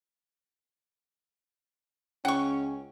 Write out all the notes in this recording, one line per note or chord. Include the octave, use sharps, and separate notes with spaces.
C#2 C#4 F#5 G5 C#6